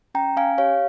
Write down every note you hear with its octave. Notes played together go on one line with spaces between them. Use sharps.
C#4 G5 A#5
C#4 F5 G#5
G4 C#5 F5